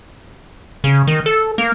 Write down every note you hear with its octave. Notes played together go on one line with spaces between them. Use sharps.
C#3
D#3
A4
A#3